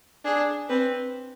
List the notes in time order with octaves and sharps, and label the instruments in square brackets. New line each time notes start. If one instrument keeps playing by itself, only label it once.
[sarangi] D4 [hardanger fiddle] G#4
[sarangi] C4 [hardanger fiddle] B4